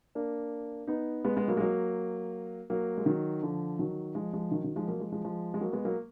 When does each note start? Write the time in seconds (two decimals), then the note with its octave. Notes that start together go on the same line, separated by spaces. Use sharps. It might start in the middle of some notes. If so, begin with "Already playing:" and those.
0.15 A#3 D4
0.87 B3 D#4
1.24 G#3 B3
1.37 G#3 B3
1.48 F#3 A#3
1.57 G#3
1.60 F#3 A#3
2.70 F#3 A#3
2.98 G#3
3.06 D#3 F#3
3.42 D3 F3
3.79 D#3 F#3
4.15 F3 G#3
4.33 F3 G#3
4.51 D#3 F#3
4.64 D#3 F#3
4.76 F3 G#3
4.88 F#3 A#3
5.00 F3 G#3
5.12 F3 G#3
5.24 F3 G#3
5.54 G#3
5.61 F#3 A#3
5.73 G#3 B3
5.85 F#3 A#3